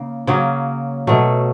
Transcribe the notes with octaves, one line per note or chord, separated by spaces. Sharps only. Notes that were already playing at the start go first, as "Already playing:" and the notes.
Already playing: C#3 A#3
C#3 F#3 A#3 C#4
B2 F#3 A3